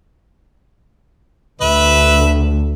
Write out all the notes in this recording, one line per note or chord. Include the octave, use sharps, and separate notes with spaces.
D2 B4 E5